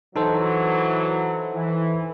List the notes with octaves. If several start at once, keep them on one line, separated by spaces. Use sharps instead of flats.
E3 F#3 D#4 A4 C5
E3